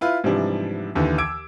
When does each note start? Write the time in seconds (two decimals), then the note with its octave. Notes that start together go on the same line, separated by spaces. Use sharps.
0.01 E4 F4 B4
0.24 G#2 C3 E3 F3 G3 D4
0.95 D#2 D3 E3
1.18 D6 E6 G#6 D7